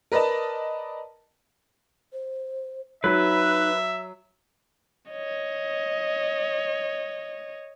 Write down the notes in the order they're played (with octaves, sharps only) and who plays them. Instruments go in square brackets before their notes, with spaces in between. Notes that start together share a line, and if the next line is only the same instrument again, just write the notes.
[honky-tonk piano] A#4 B4 D5 D#5 A5
[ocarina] C5
[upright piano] F#3 [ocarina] D#4 [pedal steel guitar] B4 [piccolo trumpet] E5
[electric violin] C#5 D#5